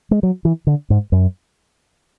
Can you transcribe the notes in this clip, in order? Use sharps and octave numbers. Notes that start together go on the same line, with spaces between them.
G#3
F#3
E3
D3
G#2
F#2